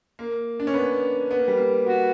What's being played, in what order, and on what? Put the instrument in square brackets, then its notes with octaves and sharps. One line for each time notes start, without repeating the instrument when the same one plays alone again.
[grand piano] A#3
D4
C#4
B3
B3
A#3
G3
A#3
[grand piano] B3 [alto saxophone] F#4